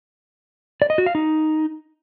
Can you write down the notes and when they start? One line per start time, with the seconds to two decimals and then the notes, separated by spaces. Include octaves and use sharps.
0.82 D5
0.90 D#5
0.98 F#4
1.06 F5
1.15 D#4